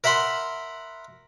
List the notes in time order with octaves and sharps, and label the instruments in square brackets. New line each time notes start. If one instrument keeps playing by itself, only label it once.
[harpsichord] A#4 E5 F#5 B5 C6